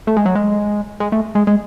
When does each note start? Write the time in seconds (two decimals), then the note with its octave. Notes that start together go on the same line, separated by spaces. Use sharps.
0.07 A3
0.17 G#3
0.26 F#3
0.35 G#3
1.00 G#3
1.12 A3
1.35 G#3
1.47 G#3